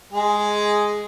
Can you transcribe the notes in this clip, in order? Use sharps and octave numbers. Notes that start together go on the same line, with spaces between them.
G#3 G#4